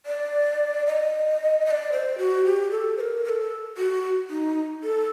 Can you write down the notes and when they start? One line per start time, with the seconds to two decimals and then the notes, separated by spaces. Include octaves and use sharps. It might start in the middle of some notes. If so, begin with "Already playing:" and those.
0.06 D5
0.86 D#5
1.66 D#5
1.71 D5
1.92 C5
2.18 F#4
2.45 G4
2.71 A4
2.97 C5
3.01 A#4
3.24 A#4
3.29 A4
3.77 F#4
4.30 D#4
4.84 A4